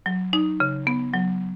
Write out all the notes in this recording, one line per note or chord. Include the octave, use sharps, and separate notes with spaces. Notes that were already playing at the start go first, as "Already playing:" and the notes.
F#3
D#4
C#3
B3
F#3